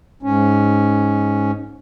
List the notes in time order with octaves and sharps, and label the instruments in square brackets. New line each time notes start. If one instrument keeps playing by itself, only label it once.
[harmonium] G#2 C#4